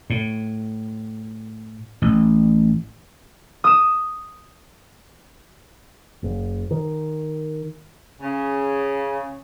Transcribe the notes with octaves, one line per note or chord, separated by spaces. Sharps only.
A2
A1
D#6 E7
F#1
D#3
C#3